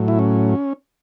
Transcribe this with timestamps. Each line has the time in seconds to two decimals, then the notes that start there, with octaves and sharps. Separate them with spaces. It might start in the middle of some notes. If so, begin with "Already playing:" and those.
Already playing: A2 F#3
0.08 E4
0.19 C#4